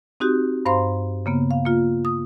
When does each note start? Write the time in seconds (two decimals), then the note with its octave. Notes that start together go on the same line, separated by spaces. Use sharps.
0.20 C4 D#4 F#4 G4
0.66 G2 C5 F5 A#5 C6
1.26 C#3 A#3 B3
1.51 F5
1.66 A#3 F4
2.05 D#6